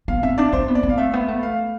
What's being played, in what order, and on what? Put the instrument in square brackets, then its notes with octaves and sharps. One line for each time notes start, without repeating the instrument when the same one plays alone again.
[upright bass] B3 [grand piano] F5
[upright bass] C4 [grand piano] E5
[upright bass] D4 [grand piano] D5
[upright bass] C4 [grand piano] C5
[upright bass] B3
[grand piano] D5
[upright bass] C4
[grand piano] F5
[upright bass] A3 [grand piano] E5
[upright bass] B3
A3
[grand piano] F5